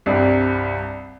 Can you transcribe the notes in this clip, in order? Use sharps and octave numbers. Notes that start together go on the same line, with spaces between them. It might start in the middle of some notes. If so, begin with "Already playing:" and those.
C2 G2 C3 D5